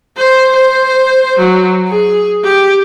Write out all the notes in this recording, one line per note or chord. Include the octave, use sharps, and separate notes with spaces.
C5
C5
F#3
G#4
G4